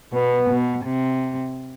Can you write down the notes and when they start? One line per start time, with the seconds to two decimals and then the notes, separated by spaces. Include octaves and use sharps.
0.13 B2 B3
0.49 B2
0.85 C3